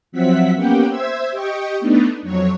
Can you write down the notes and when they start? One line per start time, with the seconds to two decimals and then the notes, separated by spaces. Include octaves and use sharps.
0.12 F3 F#3 C4 E5 F#5 B6
0.55 A#3 B3 C#4 G4 F#5 G5
0.89 C5 E5 E6 G#6
1.31 G4 D#5 G5 C#6
1.79 A3 B3 D4 D#4
2.22 F2 F#3 C#5